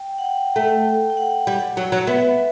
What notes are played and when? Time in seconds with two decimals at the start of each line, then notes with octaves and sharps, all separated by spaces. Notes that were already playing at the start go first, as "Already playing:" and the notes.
Already playing: G5
0.18 F#5
0.25 G5
0.55 A3 G5
1.10 G5
1.17 F#5
1.47 G3
1.77 F#3
1.92 F#3
2.07 B3 E5